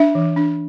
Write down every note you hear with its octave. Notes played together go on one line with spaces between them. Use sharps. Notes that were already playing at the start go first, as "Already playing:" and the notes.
Already playing: D4 E5
E3
D4